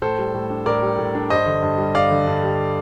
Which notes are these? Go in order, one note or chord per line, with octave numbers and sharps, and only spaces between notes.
A2 A4 C5
G3
A2
D4
A2 A#4 D5
G3
A2
D4
G2 C5 D#5
D3
G2
G3
G2 D5 F5
D3
G2
G3